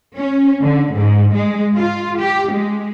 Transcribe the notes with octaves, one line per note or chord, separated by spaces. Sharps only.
C#4
D3
G#2
G#3
F4
G4
G#3